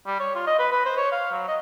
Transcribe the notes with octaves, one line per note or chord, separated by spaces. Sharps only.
G3
C#5
F4
D#5
B4
B4
C5
C#5
F5
F#3
D#5